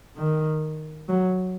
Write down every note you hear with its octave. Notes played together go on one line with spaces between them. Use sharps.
D#3
F#3